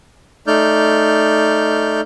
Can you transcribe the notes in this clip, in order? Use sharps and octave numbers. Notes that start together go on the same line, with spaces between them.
A3 D#4 D5 F6 G6